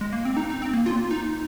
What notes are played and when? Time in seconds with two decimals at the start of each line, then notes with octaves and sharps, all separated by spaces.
0.01 G#3
0.13 A#3
0.25 C4
0.37 D#4
0.50 D#4
0.62 C4
0.73 A#3
0.86 F4
1.11 D#4